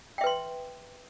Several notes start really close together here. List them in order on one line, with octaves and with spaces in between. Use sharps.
G5 E5 B4 C6